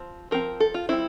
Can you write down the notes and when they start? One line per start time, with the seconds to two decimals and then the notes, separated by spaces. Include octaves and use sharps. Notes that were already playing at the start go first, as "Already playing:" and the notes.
Already playing: F3 C4
0.31 F3 C4 A#4
0.60 A4
0.74 F4
0.89 G3 C4 E4